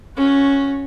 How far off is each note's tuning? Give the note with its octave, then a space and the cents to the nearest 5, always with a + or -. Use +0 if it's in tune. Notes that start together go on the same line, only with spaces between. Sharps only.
C#4 +0 F#4 -15